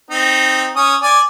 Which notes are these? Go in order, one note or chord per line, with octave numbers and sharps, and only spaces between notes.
C4 D#4
C#4 D#6
D5 G#5